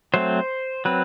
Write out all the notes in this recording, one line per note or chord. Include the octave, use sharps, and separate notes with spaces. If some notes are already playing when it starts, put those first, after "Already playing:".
F#3 A3 C4 C5
F#3 C4 B4